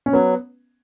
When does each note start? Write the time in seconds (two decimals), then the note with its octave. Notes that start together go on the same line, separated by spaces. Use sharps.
0.06 C#4
0.12 F#3 B3